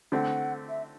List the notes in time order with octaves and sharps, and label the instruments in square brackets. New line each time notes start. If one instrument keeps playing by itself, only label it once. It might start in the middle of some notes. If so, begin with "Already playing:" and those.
[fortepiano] D3 A3 C4 [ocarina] F#5
[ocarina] E5